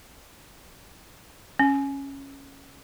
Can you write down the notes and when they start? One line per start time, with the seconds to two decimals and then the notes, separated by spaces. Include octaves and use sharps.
1.59 C#4